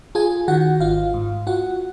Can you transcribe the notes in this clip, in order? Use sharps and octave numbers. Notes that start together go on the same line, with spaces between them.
F4 G#4 G#5
D#3 F#4 F#5
G#1 F4 F5
G#2
F4 F#4 F#5